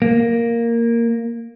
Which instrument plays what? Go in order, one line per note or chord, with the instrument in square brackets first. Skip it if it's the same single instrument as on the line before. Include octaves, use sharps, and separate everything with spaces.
[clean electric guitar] A#3